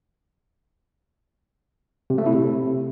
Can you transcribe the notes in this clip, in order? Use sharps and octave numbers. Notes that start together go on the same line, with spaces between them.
C3
A3
E4
C3